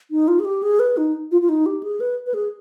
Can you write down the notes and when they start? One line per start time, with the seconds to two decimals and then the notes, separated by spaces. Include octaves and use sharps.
0.11 D#4
0.28 F4
0.39 G#4
0.45 G4
0.63 G#4
0.79 B4
0.97 D#4
1.31 F4
1.42 F4
1.49 D#4
1.66 G4
1.83 G#4
2.00 B4
2.27 B4
2.34 G#4